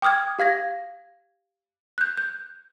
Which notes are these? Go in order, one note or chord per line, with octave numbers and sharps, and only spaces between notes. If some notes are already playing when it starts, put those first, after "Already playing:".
G5 D6 D#6 F6 G#6
G4 F5 G#6 A#6
F#6 G6
G6